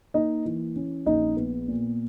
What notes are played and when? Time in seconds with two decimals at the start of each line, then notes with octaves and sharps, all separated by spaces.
0.14 A#3 D#4 D#5
0.45 E3
0.76 C#4
1.06 A#1 D#4 D#5
1.37 B3
1.68 A#2